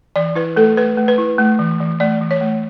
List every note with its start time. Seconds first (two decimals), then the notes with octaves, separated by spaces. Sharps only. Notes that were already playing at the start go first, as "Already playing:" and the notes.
0.16 E3 D5
0.35 E4 B4
0.56 A3 A4
0.77 A3 B4
0.97 A3
1.08 B4
1.18 E4
1.38 A3
1.59 E3
1.80 E3
2.00 A3 D5
2.21 E3
2.31 C#5
2.41 A3